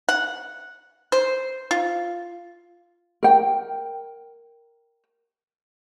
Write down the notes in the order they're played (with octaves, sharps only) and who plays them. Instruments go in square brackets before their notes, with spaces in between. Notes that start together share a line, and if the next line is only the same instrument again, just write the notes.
[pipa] F#5
C5
F4
[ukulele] A#4 G5